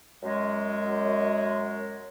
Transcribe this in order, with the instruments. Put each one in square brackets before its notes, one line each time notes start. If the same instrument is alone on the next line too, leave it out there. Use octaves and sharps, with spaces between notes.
[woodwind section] F#2 G#3